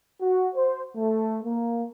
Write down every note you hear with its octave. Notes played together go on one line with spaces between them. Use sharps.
F#4
C5
A3
A#3